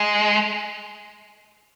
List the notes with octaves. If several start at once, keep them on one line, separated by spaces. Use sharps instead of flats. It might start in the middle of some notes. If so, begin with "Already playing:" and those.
Already playing: G#3